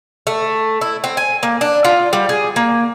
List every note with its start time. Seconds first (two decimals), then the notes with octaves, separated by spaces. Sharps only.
0.27 A3
0.81 E4
1.04 C4
1.17 G#5
1.43 A#3
1.61 D4
1.85 F4
2.13 G3
2.29 G#4
2.56 A#3